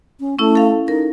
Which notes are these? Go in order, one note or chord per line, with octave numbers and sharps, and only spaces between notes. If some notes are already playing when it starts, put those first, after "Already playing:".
C#4
A3 C#4 E4
A4 F5
D#4 A#4